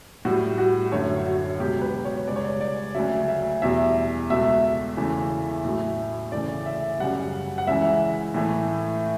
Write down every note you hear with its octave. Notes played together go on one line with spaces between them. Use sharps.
A2 G3 F#4
F#4
F#2 D3 A3 C#5
F#4
C#2 B2 F#3 G4
B4
C#5
C#2 C#3 G3 D5
C#5
D5
D5
D2 C#3 F#3 A3 E5
E5
E2 B2 G3 E5
C#2 B2 A3 E5
E2 C#3 E3 A3
A2 F#3 A3
D2 C#3 E3 A3 D5
E5
F#2 C#3 G3 F#5
F#5
C#2 C#3 E3 E5
A2 E3 A3